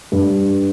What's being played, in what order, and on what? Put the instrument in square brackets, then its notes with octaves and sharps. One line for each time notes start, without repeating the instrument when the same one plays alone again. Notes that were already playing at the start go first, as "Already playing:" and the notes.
[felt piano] G2